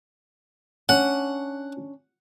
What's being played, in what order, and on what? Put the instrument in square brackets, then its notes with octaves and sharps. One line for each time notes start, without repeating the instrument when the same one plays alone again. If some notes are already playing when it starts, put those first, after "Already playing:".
[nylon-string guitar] C#4 D4 [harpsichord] F#5